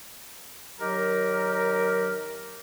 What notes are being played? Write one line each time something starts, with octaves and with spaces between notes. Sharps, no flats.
D#3 F#3 G4 A#4